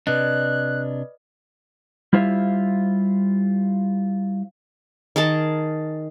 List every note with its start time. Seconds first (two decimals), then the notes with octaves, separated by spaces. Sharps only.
0.07 C3 D4 B4 D5 D#5 F#6
2.13 G3 E4 F4 C5 E5 F5
5.16 D#3 G#4 A#4 A5